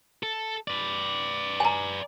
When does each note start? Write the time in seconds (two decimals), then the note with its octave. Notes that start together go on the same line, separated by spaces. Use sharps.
0.23 A4
0.68 B4 D5
1.60 G#5 A#5